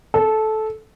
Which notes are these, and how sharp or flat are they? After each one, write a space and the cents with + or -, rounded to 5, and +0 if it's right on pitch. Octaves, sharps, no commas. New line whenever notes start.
A4 -15